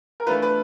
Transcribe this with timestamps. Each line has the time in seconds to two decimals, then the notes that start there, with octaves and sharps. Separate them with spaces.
0.20 A#4
0.26 E3 A3 D4 F4 B4
0.42 B4